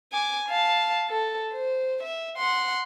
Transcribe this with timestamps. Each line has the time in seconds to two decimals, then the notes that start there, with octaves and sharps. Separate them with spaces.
0.13 G#5 D6
0.49 F5 A5
1.08 A4
1.52 C5
2.03 E5
2.37 F#5 C6